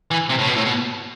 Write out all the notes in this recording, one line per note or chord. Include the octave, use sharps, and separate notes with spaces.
E3
C3
A2
B2
A2
B2